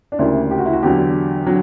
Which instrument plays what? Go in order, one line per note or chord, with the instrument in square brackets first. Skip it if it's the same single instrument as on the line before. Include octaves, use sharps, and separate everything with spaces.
[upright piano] D4
D2 C#3 G3 A#3 E4
G4
F#4
E4
F#4
E2 D3 F#3 G4
D3 F#3